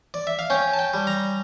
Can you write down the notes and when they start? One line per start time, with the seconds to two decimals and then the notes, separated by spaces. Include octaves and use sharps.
0.14 D5
0.27 E5
0.39 F5
0.50 C#4 G5
0.74 A5
0.79 G5
0.94 G3
1.07 A#5